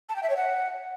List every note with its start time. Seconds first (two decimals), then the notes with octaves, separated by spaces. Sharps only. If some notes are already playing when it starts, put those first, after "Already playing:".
0.09 A5
0.16 G5
0.23 E5
0.30 C#5
0.37 F#5